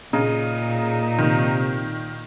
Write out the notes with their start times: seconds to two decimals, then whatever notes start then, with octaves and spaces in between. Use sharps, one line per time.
0.13 A#2 C#3 D#4
1.18 C3 D#3